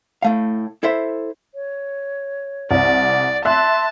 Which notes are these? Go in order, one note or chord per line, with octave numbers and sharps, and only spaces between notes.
A2 A3 F5
E4 A4 C5 E5
C#5
C2 D5
E5 A5 C6 F#6